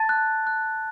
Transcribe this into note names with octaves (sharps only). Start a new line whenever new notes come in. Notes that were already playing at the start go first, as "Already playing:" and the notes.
Already playing: A5 A6
F#6
F#6